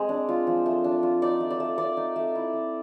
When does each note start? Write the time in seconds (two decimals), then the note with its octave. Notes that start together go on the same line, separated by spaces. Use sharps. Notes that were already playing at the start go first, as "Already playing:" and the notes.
Already playing: G#3 C4
0.09 D4
0.29 F4
0.47 F3
0.66 A3
0.84 D4
1.03 F4
1.22 D#4 D5
1.40 A3
1.50 D5
1.60 A3
1.78 C4 D5
1.97 D#4
2.16 A3
2.35 E4
2.53 A3